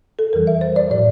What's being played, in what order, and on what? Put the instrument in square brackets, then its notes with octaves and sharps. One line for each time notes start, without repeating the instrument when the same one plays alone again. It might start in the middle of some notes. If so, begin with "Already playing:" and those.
[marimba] A4
F2 E3 G3 A#4
E5
C5
D5
A2 F3 D5